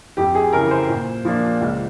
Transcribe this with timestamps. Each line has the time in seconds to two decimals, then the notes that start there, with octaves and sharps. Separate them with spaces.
0.17 F2 G4
0.35 G#4
0.53 C#3 E3 A#4
0.71 C5
0.89 A#2
1.25 F3 A#3 D4
1.61 C#2